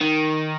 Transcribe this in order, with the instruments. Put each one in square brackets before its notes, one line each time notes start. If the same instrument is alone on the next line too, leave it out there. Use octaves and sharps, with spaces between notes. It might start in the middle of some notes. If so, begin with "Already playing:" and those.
[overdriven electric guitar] D#3